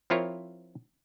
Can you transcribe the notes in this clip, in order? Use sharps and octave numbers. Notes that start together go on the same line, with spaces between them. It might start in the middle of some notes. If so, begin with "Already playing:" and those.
F3 C4 E4 F4 A#4 C#5